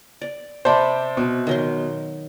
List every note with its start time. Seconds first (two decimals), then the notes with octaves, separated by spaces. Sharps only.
0.21 D5
0.65 C3 C5 D5 A5 B5
1.17 B2 C4
1.47 D#3 F#3 C6